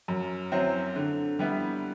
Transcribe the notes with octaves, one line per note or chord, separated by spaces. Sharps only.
F#2
F#3 C4 E4
D3
G3 B3 E4